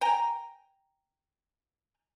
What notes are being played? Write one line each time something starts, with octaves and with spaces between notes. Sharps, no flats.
G5 G#5 A#5